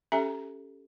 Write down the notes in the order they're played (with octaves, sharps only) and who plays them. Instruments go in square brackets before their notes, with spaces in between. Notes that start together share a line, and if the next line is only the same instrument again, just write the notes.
[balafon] C#4 G4 A4 E5 G#5 A#5